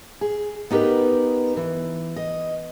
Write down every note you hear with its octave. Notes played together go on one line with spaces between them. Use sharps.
G#4
B3 D#4 G4 A#4 B4
E3
D#5